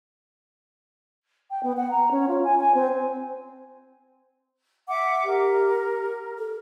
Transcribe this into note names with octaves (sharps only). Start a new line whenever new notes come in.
G5
B3
F#5
A#5
C#4
F4
G#5
G#5
C4
E5 F#5 D6
G4 A#4
A4